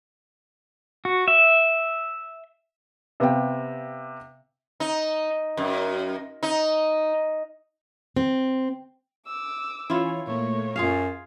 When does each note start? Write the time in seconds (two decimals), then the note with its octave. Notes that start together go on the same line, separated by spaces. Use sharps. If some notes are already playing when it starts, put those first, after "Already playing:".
1.05 F#4
1.28 E5
3.20 C3 B3 G4 F5 G5
4.80 D#4
5.57 F#2
6.43 D#4
8.16 C4
9.26 D6 E6
9.90 E3 C#4 E4 F4 C#5
10.27 A#2 A3 A#3 C#5
10.76 F#2 F4 G#4 F5